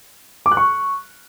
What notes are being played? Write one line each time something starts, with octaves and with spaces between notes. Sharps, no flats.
D6
F#6
C#6